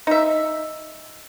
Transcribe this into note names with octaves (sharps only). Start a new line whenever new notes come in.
D#4 E5